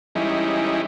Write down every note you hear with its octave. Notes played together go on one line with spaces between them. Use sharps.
E3 G3 G#3 C#4 D#4 E4